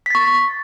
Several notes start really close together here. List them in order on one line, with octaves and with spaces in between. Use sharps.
B6 A6 C#6